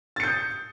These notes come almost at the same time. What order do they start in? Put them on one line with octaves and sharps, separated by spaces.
A6 C#7 G6 D#6